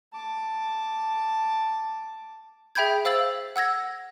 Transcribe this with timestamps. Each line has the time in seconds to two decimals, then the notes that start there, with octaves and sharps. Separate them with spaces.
0.13 A5 D6
2.75 G#4 E5 G5 B5 G6 G#6
3.05 C5 F5 E6 A6 F#7
3.56 F#5 E6 G#6 A#6